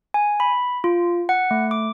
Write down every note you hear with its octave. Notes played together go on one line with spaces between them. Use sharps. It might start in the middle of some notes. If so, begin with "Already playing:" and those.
G#5
B5
F4
F#5
A3
D6